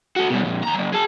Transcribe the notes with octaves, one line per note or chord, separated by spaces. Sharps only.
F#4 A4
B2 G3
F2 A#2
D#2 A#5
F#3 A#3
G#4 A5